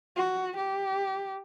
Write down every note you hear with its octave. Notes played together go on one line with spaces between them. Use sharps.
F#4
G4